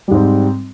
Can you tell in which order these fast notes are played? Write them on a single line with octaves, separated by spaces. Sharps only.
G3 G#2 C4